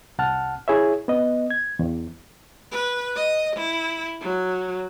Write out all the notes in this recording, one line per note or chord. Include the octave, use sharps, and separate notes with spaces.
C2 F#5 A5 F6
E4 G#4 C#5 E5
B3 D#5
G#6
E2
B4
D#5
E4
F#3